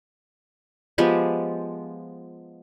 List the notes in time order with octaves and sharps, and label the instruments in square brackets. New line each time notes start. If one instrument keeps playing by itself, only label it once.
[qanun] F3 G#3 B3 G4